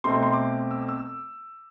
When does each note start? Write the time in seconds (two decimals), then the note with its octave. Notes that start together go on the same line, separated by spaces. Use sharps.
0.04 B2 A3 C4 C6
0.22 C6
0.33 D6
0.71 E6
0.80 D6
0.88 E6